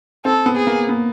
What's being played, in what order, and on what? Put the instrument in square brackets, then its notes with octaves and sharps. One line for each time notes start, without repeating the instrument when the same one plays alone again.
[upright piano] C4 [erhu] A4
[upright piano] B3
[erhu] G#4
[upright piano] A#3
B3